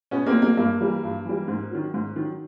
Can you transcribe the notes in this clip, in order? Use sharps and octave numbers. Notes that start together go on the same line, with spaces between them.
B2 B3 C#4
A#3 C4
F#3
A#3
G2 A#3
E3 G3
G2
E3 G3
G#2
D#3 F#3
G#2
D#3 F#3